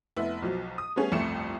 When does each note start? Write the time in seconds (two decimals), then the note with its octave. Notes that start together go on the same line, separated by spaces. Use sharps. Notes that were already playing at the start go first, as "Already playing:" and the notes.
0.16 F1 B3 E4
0.42 B1 F3 F#3
0.78 D#6
0.96 G3 A3 B3 C#4 G#4
1.12 G1 C2 F2 A3 C#7 E7